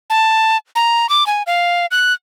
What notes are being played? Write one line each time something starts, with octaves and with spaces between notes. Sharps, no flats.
A5
A#5
D6
G#5
F5
F#6